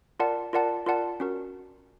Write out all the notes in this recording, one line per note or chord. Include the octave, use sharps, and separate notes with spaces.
F4 A#4 D5 F#5 A5
F4 A#4 D5 F#5 A5
F4 A#4 D5 F#5 A5
C#4 F#4 A#4